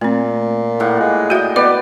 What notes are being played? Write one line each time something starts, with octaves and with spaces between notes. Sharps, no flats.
A#2 A3 C4
A2 A#3 F#5
G#3
F#4 D#5 E5 G5
B3 B4 D5 D#5